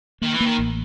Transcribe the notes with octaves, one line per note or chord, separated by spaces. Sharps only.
D#3 A#3
E3
A#3
D#3
A1